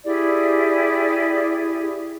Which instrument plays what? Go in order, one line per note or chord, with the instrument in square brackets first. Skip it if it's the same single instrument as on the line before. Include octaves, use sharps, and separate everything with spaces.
[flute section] E4 G4 G#4 D5